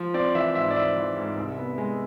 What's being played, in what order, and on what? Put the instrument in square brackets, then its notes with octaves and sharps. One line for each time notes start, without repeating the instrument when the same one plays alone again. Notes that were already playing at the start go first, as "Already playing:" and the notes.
Already playing: [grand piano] F3
C4 D5
E3 E5
G#2 E5
D5
E3 E5
E3
G#2
C2
B3
G#3